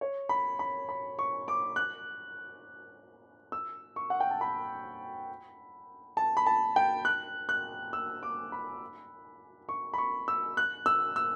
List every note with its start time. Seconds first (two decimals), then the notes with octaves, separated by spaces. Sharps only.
0.01 C#5
0.29 B5
0.59 B5
0.89 B5
1.19 C#6
1.48 D6
1.76 F#6
3.52 E6
3.96 C#6
4.10 F#5
4.20 G5
4.31 A5
4.41 B5
6.17 A5
6.37 B5
6.47 A5
6.76 G5
7.05 F#6
7.49 F#6
7.93 E6
8.23 D6
8.52 B5
9.69 C#6
9.94 B5
9.98 C#6
10.28 E6
10.57 F#6
10.86 E6
11.16 E6